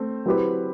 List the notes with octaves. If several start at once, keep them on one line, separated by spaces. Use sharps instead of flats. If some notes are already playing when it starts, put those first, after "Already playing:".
Already playing: A3 C4
F#3 C4 E4 G4 B4